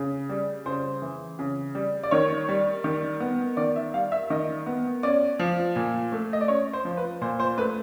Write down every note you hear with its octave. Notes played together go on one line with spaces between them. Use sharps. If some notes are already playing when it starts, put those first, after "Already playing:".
Already playing: C#3
G3
C#3 C5
E3
C#3
G3
D5
D#3 C#5
G3
D#3
B3
D#3 D5
E5
G3 F5
E5
D#3 D#5
B3
C#4 D5
F3
A#2
A3
D#5
D5
C#4 C#5
C5
F3
B4
A#2 C5
C5
A3 B4